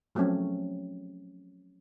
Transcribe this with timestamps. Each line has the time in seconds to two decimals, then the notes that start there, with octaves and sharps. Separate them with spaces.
0.15 F3 F#3 A3 C4 C#4